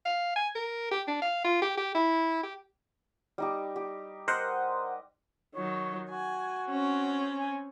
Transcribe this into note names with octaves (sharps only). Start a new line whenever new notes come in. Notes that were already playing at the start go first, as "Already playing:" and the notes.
F5
G#5
A#4
G4
D4
F5
F4
G4
G4
E4
G4
G3 D#4 G4
G4
A#4 C5 D#5 F#5
D#3 F#3 C#5
F#4 G#5
C4 C#4
G#5